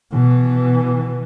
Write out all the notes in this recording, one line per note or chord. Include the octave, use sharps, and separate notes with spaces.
B2 E3